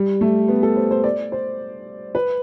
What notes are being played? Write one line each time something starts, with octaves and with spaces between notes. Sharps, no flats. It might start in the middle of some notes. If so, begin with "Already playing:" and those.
Already playing: G3
A3
B3
A4
C5
C5
D5
C5
B4